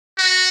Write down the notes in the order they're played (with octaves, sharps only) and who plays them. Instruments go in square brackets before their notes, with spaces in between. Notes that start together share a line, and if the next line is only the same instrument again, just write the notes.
[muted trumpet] F#4